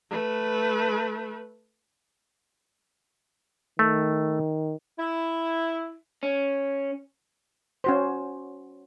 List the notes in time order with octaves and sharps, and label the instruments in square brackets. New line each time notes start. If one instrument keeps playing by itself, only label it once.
[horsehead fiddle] A3 B4
[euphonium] D#3 [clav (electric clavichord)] A3
[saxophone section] E4
[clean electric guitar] C#4
[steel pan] C#4 F#4 C5